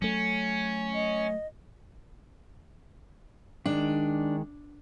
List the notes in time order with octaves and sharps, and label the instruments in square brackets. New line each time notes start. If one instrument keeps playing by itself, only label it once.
[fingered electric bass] F#3 A3 [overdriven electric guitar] C#4
[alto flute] D#5
[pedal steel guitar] D#3 G#3 [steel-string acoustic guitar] D4